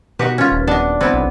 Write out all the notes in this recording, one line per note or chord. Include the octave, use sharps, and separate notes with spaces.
B2 D#4 F#4 G4 B4
C#4 F4
D#1
B3 D4 D#5
B3 C4 E4
B1